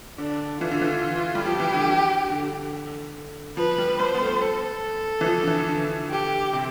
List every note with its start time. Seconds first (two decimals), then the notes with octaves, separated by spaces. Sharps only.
0.18 D3 D4
0.61 E3 F4
0.71 D3
0.81 E3
1.35 G3
1.46 F3 G4
1.60 E3
1.74 D3
1.88 D3
2.30 D3
3.57 F3 B4
3.78 G3
3.99 G3 C5
4.14 B3
4.20 A3
4.42 A4
5.21 E3
5.26 F3
5.43 D3
5.47 E3
5.69 D3
6.11 G4
6.53 C3